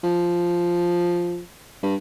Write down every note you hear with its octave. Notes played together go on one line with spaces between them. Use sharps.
F3
G2